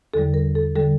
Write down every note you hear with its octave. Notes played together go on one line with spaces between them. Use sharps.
E2 D3 G3 A4
A#4
A4
D3 G3 A4